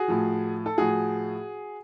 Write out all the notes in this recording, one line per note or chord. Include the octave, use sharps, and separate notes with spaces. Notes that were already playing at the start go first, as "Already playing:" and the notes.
Already playing: F#4 G#4
A2 F3
A4
A2 F3 F#4 G#4